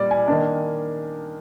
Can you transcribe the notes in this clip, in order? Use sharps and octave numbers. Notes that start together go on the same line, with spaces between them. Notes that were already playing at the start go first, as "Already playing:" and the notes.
Already playing: A#2 G3 D5
G#5
D#3 A#3 D4